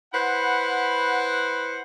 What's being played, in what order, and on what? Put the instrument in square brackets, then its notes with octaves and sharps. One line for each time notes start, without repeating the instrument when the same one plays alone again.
[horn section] E4 B4 C5 F#5